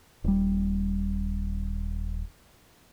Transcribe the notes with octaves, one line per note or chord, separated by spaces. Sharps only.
D#1 G3